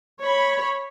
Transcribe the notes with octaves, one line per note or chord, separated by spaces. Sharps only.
C#5 B5